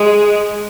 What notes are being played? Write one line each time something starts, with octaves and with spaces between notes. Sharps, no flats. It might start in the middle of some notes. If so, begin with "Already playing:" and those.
Already playing: G#3